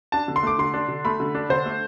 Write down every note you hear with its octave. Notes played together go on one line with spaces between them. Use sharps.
D4 A5
D3
C6
A3 D6
D3 C6
D4
D3
A3 B5
D3
D4
D3 C5
A3